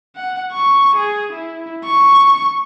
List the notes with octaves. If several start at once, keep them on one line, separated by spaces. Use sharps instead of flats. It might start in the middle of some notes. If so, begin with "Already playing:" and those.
F#5
C#6
G#4
E4
C#6